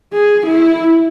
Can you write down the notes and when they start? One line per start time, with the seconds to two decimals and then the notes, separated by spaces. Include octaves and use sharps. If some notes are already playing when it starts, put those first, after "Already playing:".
0.13 G#4
0.46 E4